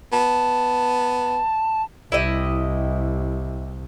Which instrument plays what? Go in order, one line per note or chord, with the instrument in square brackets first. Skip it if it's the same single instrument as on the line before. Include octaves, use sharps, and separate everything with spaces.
[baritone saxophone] B3 [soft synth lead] A5
[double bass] C2 [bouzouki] E4 G4 D#5